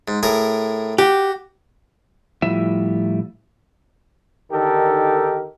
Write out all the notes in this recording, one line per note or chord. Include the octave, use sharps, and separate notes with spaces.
G#2
A2 G#4 A#4
F#4 G4
A2 F3 G3 E4 E5
D3 D#3 D#4 G4 A4 A#4